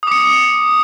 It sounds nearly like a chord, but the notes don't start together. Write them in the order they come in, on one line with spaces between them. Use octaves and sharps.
D#6 D6 C#7